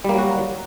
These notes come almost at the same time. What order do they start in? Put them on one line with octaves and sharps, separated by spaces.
G3 A#3 F#3 F#4